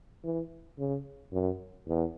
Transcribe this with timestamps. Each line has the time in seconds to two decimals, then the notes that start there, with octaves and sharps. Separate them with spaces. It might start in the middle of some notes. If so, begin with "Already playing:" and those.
0.24 E3
0.79 C#3
1.33 F#2
1.88 E2